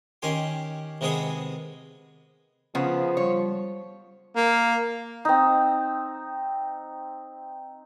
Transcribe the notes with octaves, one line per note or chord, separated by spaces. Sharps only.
D#3 C#4 G4 G#5 C6
C3 D#3 G#3 B3 G#4 D#6
C#3 F3 B3
G3 C#5
A#3
C4 D#4